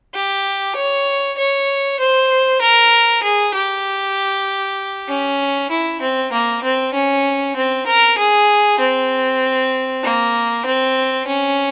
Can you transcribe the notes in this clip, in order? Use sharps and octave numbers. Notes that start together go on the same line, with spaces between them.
G4
C#5
C#5
C5
A#4
G#4
G4
C#4
E4
C4
A#3
C4
C#4
C4
A#4
G#4
C4
A#3
C4
C#4